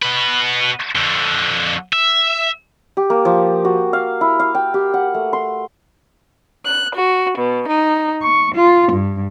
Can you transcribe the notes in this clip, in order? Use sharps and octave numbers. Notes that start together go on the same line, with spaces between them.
B2 B4
F2 D3
E5
G4
A#3
F3
F#4
F5
E4
F5
G5
G4
F#5
A3
C6
F#6
F#4
B2
D#4
C#6
F4
G2